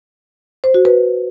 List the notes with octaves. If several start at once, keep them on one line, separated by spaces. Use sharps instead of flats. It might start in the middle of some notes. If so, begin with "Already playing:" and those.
C5
F#4
B4